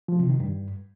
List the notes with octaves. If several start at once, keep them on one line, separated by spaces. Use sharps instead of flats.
F3
C3
D#3
G2